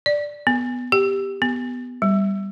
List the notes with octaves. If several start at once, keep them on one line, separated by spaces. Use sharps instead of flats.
D5
B3
G4
B3
G3